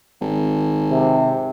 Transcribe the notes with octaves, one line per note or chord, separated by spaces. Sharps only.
G#1
C3